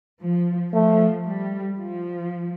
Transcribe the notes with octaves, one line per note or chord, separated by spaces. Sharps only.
F3
F3 A3
G3
F3